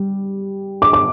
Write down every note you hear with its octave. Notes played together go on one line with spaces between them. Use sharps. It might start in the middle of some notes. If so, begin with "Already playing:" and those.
Already playing: G3
D6
D6